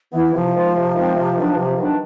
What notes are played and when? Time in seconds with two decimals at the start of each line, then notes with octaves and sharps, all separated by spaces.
0.13 E3 B3 E4
0.33 C3 F3
0.54 D#3 G#3 C4 F4
0.75 C3
0.95 D#3 G#3 C4 F4
1.16 C3
1.37 D#3 F#3 B3 D4
1.57 C3
1.78 D#3 F#3 B3 D4